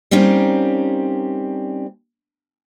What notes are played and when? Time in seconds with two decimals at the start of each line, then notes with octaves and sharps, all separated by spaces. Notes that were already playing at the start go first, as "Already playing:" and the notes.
0.11 G3 A#3 C4 C#4 D#4